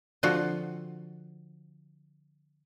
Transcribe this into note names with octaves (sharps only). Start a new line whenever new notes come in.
D3 F3 C4 F4 F#4